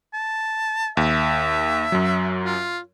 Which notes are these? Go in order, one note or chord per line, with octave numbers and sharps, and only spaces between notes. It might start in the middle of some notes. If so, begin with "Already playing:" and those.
A5
D#2 E5
F#2 F#3
F4